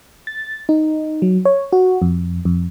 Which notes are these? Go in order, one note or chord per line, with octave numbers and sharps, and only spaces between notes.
A6
D#4
F#3
C#5
F#4
F2
F2